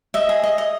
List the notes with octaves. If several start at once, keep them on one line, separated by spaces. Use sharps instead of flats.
D#5 E5
G#4
D#5
D#5